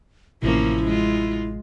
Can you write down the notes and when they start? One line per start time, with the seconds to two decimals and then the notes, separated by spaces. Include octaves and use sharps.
0.42 A1 C3 F3 A#3 C#4 E4
0.84 G#3 F4